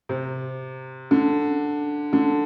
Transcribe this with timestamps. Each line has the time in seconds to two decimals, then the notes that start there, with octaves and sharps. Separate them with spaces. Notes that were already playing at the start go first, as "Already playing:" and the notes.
0.09 C3
1.11 D3
2.13 D3